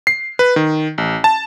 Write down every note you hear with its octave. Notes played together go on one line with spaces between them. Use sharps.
C7
B4
D#3
A1
A5